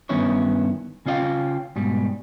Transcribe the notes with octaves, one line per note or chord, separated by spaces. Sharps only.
G2 D#3 B3 C#4 E4 C#5
C#3 C#4 F4 D#5 F5 G5
G#2 B2 G3